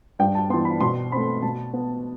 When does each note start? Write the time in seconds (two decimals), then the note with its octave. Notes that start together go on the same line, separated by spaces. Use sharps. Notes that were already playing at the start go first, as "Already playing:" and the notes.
0.19 G2 G5
0.35 A5
0.50 E3 B3 C6
0.65 B5
0.81 B2 C6
1.12 A3 C4 B5
1.42 B2 A5
1.73 B3